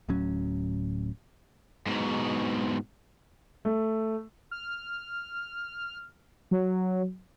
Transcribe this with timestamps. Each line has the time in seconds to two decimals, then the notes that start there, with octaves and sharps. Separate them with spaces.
0.09 D1 A2 F#3 C#4
1.87 G#2 B2
3.65 A3
4.51 F6
6.51 F#3